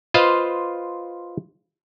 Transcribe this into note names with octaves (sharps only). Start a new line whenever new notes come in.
F4 B4 C5 D#5 F5